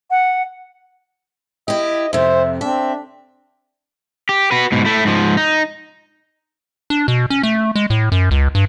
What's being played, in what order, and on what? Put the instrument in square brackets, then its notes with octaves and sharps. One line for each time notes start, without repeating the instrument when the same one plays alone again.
[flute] F#5
[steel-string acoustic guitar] E4 G4 [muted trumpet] D#5
[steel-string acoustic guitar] F2 C3 [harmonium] C5 [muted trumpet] E5
[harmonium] C4 [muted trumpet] D4 [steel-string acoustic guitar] E5
[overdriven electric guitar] G4
F#4 B4
G#2 B2
A3 E4
G#2 F3
D#4
[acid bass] D4
B2
C#4
A3
G#3
A2
F#2
C#2
G2